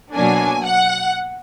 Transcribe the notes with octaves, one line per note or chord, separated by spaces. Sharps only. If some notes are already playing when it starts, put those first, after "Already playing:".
B2 F#3 A#3 D4 G#5
F#5